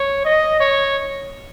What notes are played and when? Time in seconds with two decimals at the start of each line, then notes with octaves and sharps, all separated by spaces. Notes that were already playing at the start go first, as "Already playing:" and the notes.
Already playing: C#5
0.25 D#5
0.60 C#5